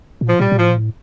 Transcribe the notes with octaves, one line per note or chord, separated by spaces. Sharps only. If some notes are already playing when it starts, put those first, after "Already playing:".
A#2
F3
A#2 G3
A#2
A2 F3
A#2
A2